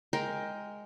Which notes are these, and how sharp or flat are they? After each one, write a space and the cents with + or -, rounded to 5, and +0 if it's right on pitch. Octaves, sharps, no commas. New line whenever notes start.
G#3 +0 A#4 +10 G5 +0